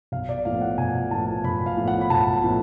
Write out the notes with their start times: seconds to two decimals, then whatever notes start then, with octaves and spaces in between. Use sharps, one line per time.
0.12 B1 F5
0.29 D5
0.45 A2 F3 B3 F5
0.62 F#5
0.78 B1 G#5
1.11 A2 F3 B3 A5
1.44 B1 B5
1.66 F5
1.77 A2 F3 B3
1.88 F#5
2.01 B5
2.10 B1 A5
2.43 A2 F3 B3